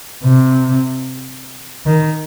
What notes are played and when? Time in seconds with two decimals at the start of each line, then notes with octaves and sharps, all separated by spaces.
0.24 C3
1.86 D#3